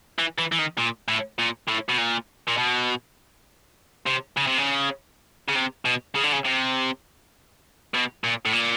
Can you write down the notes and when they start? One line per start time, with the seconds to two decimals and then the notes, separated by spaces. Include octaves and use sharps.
0.19 E3
0.38 E3
0.52 E3
0.59 D#3
0.78 A#2
1.08 A2
1.39 A#2
1.68 A2
1.89 B2
1.97 A#2
2.48 A#2
2.57 B2
4.06 C3
4.37 C#3
4.47 C3
4.58 C#3
5.49 C#3
5.56 C3
5.85 B2
6.15 C#3
6.24 D3
6.33 C#3
6.45 C3
7.94 B2
8.24 A#2
8.46 A2
8.53 A#2